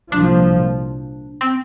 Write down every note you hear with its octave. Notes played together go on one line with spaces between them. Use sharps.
C2 A#2 F3 D4
C4